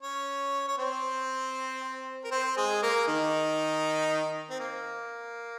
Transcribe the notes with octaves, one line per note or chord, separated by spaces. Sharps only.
C#4 C#5
C#5
C4 C5
A#4
C4 C5
G#3 G#4
A#3 A#4
D#3 D#4
C4
A#3